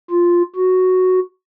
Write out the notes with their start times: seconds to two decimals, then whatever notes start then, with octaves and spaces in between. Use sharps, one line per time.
0.10 F4
0.56 F#4